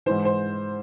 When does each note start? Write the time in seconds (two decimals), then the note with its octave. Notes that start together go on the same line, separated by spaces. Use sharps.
0.06 G#2 E3 C5
0.25 C5